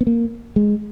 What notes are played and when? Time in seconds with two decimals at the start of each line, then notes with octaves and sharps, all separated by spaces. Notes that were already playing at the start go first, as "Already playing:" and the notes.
0.01 B3
0.07 A#3
0.56 G#3